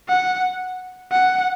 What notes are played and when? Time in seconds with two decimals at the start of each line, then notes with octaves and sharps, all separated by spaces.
0.09 F#5
1.12 F#5